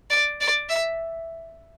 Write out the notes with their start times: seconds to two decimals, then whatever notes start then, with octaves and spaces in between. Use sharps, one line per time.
0.10 D5
0.41 D5
0.69 E5